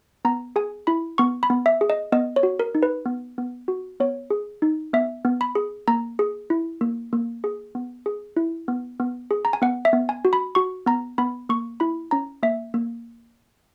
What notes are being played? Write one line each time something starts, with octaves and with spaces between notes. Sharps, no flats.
B3 A#5
G#4 G#5
E4 B5
B3 C#6
B5
B3
E5
G#4
D#5
B3 D#5
C#5
F#4
A#4
D#4
B4
B3
B3
F#4
B3 C#5
G#4
D#4
B3 E5
B3
B5
G#4
A#3 A#5
G#4
E4
A#3
A#3
G#4
B3
G#4
E4
B3
B3
G#4
A#5
G#5
B3 F#5
E5
B3
G#5
F#4
B5
F#4 C#6
B3 A#5
B3 B5
A#3 C#6
E4 B5
C#4 A#5
A#3 E5
A#3